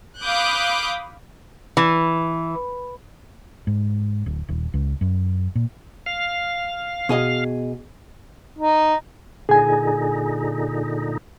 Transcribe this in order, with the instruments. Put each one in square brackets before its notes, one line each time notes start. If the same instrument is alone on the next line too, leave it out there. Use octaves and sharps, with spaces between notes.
[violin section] F5 B5 D6 D#6 F#6 G6
[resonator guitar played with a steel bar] E3
[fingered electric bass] G#2
D1
D#1
C#2
F#2
A#2
[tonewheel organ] F5
[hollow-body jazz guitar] B2 G#4 D#5
[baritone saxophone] D#4
[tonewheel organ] A#2 D3 D#4 [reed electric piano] G#4 G#5